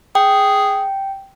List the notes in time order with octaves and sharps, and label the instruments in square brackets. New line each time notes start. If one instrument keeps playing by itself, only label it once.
[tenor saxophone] G#4 [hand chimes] G5